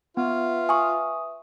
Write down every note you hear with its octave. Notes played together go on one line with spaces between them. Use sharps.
B3 F4 B4 E5
G#5 C#6 D#6